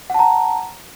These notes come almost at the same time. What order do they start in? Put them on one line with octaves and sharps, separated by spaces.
F#5 A5 A#5